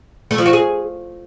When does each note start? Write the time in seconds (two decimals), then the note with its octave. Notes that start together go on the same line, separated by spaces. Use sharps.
0.31 A3
0.38 F3
0.46 F#4
0.53 G#4